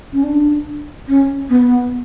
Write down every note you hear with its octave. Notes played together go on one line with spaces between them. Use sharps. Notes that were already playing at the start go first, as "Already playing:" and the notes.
C#4
D4
C#4
B3